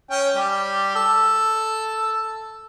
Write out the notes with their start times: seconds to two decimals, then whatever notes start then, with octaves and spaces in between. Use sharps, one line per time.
0.11 C#4 G5
0.36 G3 G4
0.96 A4 E6